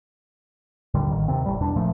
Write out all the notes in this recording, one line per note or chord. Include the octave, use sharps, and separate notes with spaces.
D#2 A#2 D3 G3
A1 D#3
D#2 C3 C4
D1 A1 G3
E2 B2 D4
D#1 A#2 F3 A3